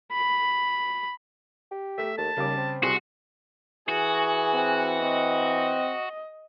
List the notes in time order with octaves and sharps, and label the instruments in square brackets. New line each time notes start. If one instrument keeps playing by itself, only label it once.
[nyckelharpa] B5
[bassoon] G4
[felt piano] A3 B6 [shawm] E5
[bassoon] D#2 [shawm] A5
[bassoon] D#2 [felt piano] C#3 G3 D6
[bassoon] C4
[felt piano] C2 G#4 [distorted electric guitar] F#4 [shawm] C6
[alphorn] E3 [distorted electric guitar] F#4 [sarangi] G#4
[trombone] C4
[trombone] C4 [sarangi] D#5